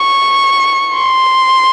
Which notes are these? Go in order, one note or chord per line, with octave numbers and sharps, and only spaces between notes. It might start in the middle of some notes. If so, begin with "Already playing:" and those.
Already playing: C#6
C6